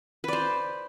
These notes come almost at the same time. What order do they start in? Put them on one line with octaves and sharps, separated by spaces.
B4 D5 C5